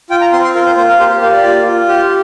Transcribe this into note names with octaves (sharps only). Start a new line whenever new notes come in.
F4 G5
A#5
C4 C6
C6
F4 A#4
C5
A#3 C5
A#4
G4 C5
C5
A#3 F5
D5
F4
F4
G4